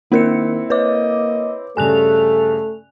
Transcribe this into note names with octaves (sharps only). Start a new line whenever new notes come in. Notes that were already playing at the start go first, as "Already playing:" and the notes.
D#3 A#3 C4 E4 A#4 C#7
A#3 B4 C#5 D#5 D6
G2 C#3 A3 A4 G#5 F#6 F7